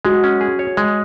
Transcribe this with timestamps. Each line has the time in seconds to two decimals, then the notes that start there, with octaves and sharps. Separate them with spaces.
0.05 G#3 F#4
0.24 C#4
0.41 G#4
0.59 C#5
0.77 G#3